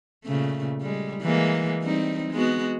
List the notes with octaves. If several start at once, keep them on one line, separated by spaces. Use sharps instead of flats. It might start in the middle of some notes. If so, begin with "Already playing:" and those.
A#2 C#3 A3
G3 G#3
E3 G#3 A#3
G3 C4 D#4
G#3 B3 F#4